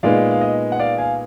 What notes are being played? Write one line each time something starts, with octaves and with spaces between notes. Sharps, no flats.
A#2 G#3 B3 D#4 D5 F5
F5
D#5
F#5
D5 F5
F5 G#5